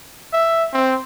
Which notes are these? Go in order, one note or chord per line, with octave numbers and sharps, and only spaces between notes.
E5
C4